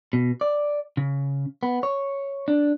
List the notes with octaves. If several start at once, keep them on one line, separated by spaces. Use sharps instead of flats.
B2
D5
C#3
B3
C#5
D4